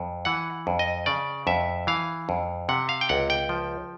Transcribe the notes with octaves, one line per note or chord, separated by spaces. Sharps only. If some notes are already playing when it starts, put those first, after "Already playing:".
Already playing: F2
E3 F#5
F2
D#5
C#3 D5
F2 E5
E3 F5
F2
C3 F#5
F5
G5
C#2 F#5
G5
F3